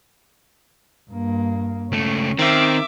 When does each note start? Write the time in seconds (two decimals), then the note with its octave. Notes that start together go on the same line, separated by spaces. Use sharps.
1.10 G2 A#3
1.92 C#2 A3 C#4
2.39 D#3 C4 E5 D6